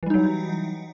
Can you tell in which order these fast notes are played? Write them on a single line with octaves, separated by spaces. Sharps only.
E3 G3 D#4 F#3